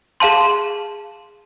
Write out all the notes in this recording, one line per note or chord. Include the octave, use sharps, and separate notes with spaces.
G#4 F5 A5 C6